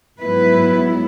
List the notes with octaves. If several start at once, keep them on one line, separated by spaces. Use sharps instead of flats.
G#2 F#3 B3 E4 B4